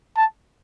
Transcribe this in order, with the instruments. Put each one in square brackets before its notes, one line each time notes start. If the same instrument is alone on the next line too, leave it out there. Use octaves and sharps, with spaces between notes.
[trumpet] A5